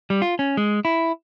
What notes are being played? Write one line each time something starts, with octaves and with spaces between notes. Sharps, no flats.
G3
F4
C#4
G#3
E4